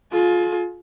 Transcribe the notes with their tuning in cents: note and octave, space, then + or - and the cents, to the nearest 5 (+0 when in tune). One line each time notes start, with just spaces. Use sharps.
F4 +20 G#4 +40